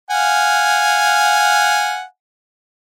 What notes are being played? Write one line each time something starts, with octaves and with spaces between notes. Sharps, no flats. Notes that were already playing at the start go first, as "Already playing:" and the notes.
F5 F#5 G#5